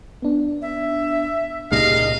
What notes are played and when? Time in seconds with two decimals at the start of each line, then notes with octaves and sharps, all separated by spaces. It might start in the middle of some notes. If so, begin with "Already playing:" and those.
0.22 B3 D4
0.62 E5
1.71 C#2 A#2 A#3 D#4 G4 G#4 D#5 F5